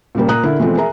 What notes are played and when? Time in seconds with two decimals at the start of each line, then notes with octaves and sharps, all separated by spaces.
0.15 A#2 C#3 G3 A#3
0.28 A#2 A#3 A#5 D#6 F#6
0.43 D3 E4 A#4
0.59 B2 E3 F3 G#3 A3 C4
0.77 G#4 A#4 E5 A#5